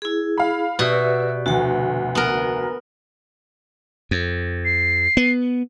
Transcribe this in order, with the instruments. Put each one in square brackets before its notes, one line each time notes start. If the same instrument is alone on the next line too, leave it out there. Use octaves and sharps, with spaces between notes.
[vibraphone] E4 G#4
[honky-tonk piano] F5 B5
[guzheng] B2 [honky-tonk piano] F#4 E5 [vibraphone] G4 B4 D5
[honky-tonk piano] F1 D2 [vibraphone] F#4 F#5
[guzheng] B3 A#4
[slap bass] F2
[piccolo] C7
[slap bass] B3